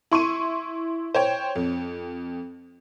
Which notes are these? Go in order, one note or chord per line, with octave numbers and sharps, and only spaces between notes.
E4 C6 C#6 D#7
C5 C#5 G5
F2